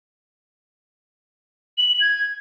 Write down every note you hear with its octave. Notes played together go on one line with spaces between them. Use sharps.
F#7
F#7
G#6